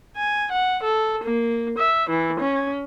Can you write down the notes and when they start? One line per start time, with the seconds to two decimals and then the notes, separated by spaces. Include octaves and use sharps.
0.16 G#5
0.51 F#5
0.84 A4
1.22 A#3
1.77 E5
2.09 E3
2.39 C#4